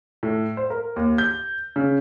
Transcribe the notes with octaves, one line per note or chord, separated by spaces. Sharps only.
A2
C5
A#4
D#2
G6
C#3